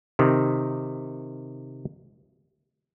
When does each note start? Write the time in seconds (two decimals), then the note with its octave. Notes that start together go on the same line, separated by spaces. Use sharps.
0.19 C3 D#3